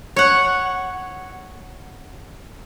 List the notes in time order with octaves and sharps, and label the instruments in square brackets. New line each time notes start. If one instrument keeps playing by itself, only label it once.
[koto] C#5 F#5